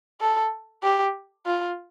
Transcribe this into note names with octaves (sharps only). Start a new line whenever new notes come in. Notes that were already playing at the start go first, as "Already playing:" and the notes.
A4
G4
F4